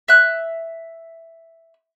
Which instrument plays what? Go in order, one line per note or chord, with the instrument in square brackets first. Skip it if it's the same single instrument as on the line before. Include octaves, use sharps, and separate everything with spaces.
[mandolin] E5 F#6